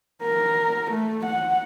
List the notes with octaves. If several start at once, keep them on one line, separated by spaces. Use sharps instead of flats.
A#4
A3
F#5